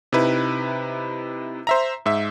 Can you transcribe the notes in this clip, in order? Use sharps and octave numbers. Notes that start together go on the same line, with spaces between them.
C3 D#4 E4 B4
C5 E5 A#5
G#2 E5